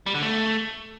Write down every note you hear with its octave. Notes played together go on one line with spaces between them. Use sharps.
G3
D3
A3